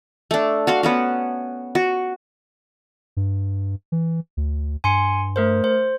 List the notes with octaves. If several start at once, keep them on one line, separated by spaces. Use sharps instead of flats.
A3 D4
F#4 F5 C6
B3 C#4 F#4
F#4
G2
E3
D2
G2 G#5 C6 C#7
A3 A#4 C5
C5